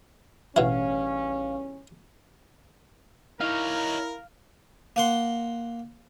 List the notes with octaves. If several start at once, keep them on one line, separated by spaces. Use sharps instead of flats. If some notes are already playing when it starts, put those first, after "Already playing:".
A1 E2 G2 B2 C#4 E4 F5
D#4 E4 A#4 C#5 F5
A#3 F#5 C6